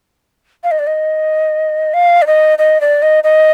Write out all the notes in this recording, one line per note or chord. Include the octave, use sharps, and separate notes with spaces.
F5
D#5
D5
D#5
F5
D5
D#5
D#5
D5
D#5
D#5